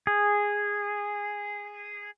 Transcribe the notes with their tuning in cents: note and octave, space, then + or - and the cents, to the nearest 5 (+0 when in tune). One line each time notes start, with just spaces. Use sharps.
G#4 -10